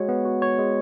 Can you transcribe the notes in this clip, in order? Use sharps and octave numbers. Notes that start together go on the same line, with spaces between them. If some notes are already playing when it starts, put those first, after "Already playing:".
Already playing: G#3 F#4 C#5
B3
F#4
C#5
G#3